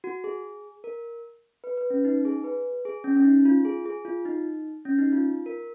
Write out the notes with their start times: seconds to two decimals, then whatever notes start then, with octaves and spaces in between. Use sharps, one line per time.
0.04 F#4
0.24 G#4
0.84 A#4
1.64 B4
1.77 B4
1.90 C#4
2.05 D#4
2.25 G#4
2.44 B4
2.85 G#4
3.04 C#4
3.16 C#4
3.24 D#4
3.45 F4
3.65 G#4
3.85 G#4
4.05 F4
4.25 D#4
4.85 C#4
4.98 D#4
5.13 F4
5.46 A#4